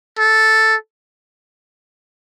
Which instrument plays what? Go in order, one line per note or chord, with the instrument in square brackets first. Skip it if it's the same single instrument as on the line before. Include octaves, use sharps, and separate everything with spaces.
[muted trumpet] A4